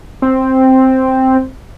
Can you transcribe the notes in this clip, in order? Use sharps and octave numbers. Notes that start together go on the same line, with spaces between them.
C4